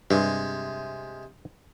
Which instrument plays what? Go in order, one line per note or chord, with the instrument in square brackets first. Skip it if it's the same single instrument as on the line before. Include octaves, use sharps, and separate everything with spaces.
[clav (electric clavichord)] G2 [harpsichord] C3 G#3